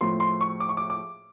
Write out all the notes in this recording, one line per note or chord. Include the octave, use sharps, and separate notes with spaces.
A2 F3 C6
C6
C#6
D6
C#6
D6
D6